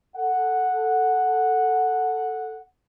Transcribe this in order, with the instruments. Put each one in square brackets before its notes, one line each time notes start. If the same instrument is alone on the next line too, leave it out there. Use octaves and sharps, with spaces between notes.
[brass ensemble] A4 F#5